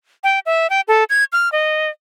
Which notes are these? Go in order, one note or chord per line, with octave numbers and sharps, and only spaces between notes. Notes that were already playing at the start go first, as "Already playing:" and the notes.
G5
E5
G5
A4
G#6
F6
D#5